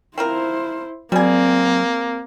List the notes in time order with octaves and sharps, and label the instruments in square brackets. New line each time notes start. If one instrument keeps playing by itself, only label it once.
[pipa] C4 F4 A#4 [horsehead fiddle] E4 C5
[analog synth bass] F#3 [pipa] G3 G#4 [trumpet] A#3 [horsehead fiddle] C4